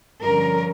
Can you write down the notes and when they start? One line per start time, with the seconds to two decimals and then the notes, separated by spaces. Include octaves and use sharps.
0.22 G2 D3 F3 C#4 A#4